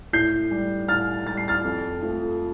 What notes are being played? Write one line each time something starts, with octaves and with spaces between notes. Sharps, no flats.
A2 G6 C7
G3
A2 F6 A6
G3 A6
C7
F6 A6
F2
F3 A3